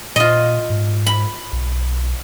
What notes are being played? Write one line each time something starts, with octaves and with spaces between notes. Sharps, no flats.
A#2 F4 D#5
G#2
B5
B1